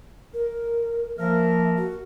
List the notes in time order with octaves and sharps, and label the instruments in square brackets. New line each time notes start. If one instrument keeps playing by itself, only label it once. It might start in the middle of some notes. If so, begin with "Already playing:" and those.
[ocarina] A#4
[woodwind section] F3 A#3 A#4 [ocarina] E5
[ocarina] F#4